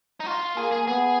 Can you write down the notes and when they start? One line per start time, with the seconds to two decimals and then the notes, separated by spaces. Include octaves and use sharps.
0.20 D#4
0.26 F4
0.56 A#3 G#4
0.71 G#4
0.87 B3 G#4